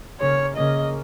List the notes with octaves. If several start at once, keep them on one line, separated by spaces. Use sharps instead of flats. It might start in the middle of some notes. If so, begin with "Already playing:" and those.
C#3 A#3 C#4 G#4 C#5
C#3 A#3 C#4 G#4 D#5